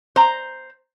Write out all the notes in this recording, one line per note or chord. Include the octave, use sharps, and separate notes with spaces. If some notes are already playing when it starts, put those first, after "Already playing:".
C5 A#5